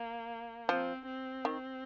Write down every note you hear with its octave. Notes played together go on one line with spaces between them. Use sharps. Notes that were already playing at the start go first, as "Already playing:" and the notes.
Already playing: A#3
F3 C4
C4
D#3